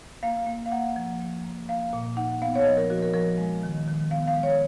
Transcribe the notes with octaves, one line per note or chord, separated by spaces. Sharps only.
A#3 F5
A#3
F5
A#3 F#5
F3
A#3
A#3
A#3 F5
A#2
D#4 F#5
B3 F5
C#5
F3 D#5
A#4
F3 F#4
A#4
F3 A#4
G#3
D#3
D#3
B3 F5
F5
G#3
C#5